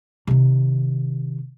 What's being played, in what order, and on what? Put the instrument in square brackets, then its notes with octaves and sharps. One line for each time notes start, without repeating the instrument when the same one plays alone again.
[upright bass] C3 D#3